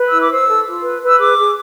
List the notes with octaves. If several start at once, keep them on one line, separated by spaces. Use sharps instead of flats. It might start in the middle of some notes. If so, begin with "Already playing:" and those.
Already playing: B4
E4 E6
D6
C5 E6
A4
F4
B4
B4
E6
G#4 D6
G#4